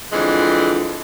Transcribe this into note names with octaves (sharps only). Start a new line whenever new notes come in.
F2 D3 E3 G#3